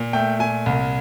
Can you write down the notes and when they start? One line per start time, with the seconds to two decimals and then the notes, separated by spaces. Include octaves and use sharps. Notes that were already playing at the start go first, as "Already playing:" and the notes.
Already playing: A#2
0.13 A3 G5
0.39 A#2 G#5
0.66 C2